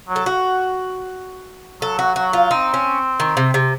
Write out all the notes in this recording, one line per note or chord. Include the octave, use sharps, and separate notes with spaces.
F#3
A4
F#4
F#3 A4
F#4
F#3 F#4
F4
C4 D#4
C#4
D#3
C3
C3